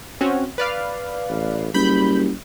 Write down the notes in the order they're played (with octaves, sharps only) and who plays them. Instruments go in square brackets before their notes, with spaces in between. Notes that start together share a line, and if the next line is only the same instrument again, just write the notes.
[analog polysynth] C4 C#4 F#4
B4 D5 F5
[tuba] A1
[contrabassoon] F#1 [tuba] G3 [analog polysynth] B5 G6